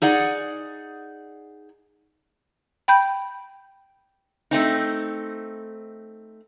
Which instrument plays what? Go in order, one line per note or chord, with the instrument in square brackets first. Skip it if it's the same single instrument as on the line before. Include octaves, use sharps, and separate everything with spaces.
[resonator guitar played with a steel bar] D#4 G#4 D5 F#5
[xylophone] G5 B5 G6
[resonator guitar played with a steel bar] A3 C4 D#4